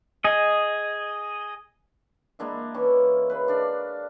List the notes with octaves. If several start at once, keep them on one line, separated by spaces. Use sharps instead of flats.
G#4 D#5
G#3 A#3 D4 E4
E3 C#4
C#3 B4
D4 D5 F5